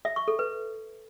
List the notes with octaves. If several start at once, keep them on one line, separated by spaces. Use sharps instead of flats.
E5
C#6
A4
B4